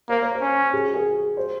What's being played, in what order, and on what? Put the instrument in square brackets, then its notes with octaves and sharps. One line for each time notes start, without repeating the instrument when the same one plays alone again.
[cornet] A#3 [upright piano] C5
[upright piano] C#5
C5
[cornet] C#4
[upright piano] G#4
F#4
G#4
C5